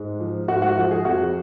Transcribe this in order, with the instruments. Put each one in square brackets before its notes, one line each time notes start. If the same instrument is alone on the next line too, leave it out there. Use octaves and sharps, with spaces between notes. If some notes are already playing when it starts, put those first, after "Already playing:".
Already playing: [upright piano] G#2 G#3
F3
G#2 F#4
F#4
F3 F#4
G#4
F2 F#4